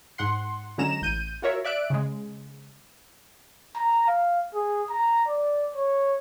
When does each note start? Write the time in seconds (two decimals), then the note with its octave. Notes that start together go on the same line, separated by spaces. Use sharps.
0.18 G#2 F#5 C6
0.78 D3 F#3 G#3 C#4 A#5 E7
1.02 A1 G6 D#7
1.42 F4 F#4 A#4 C#5 E5
1.64 D5 E5 F#6 D7
1.90 C#3 G#3
3.76 A#5
4.08 F5
4.55 G#4
4.90 A#5
5.28 D5
5.76 C#5